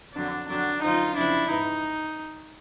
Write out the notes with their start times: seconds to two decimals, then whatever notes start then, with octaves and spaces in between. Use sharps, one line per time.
0.14 F2 D3 F#3 D4
0.48 F2 D3 F#3 D4
0.82 F#2 D3 F3 D#4 F4
1.15 F2 C#3 F3 D4 E4
1.49 G#2 E3 D#4